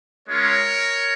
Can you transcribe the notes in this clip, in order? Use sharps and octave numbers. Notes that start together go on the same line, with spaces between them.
G#3 C#4 F4 A#4 C#5